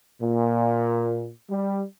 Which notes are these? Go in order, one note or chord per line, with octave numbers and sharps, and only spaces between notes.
A#2
G3